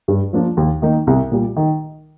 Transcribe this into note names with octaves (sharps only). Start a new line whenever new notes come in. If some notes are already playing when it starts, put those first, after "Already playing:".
G2
F3 A#3 D4 F4
D#2
D#3 A#3 D#4
C2
A#2 G3
D#3